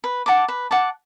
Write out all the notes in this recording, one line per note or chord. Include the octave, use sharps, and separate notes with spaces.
B4
F#5 A5 D6
B4
F#5 A5 D6